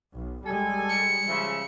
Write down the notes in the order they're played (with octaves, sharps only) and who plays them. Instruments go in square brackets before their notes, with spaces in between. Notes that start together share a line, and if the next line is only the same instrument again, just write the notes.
[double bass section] B1
[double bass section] G3 G#3 [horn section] A4 G#5
[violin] C#7
[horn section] C#3 F3 E5